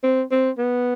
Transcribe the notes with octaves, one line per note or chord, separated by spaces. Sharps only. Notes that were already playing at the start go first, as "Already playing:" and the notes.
C4
C4
B3